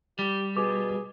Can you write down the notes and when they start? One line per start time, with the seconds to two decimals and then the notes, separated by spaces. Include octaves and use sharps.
0.19 G3 G4
0.57 B2 G#4 D6